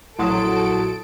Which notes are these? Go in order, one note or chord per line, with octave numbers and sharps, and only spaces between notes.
A#1 F#3 E4 A4 A5 C6 D#6 D7